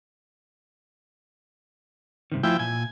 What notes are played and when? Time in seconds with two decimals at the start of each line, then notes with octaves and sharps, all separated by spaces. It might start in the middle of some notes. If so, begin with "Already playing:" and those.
2.32 G2 C3 D#3
2.43 F3 A3 E4 E5 G5 G#5
2.59 A#2 G#5